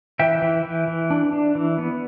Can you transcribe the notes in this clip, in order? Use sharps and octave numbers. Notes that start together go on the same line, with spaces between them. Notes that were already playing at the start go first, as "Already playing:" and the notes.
E3 E5 G5
E3
E3
E3
D4
D4
E3
B3